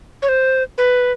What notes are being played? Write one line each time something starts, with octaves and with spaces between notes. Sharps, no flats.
C#5
C5
B4